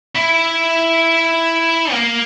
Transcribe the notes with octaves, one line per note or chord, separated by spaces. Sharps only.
E4
A#3